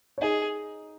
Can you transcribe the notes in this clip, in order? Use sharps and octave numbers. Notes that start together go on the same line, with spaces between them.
C#5
D#4 G#4 D#5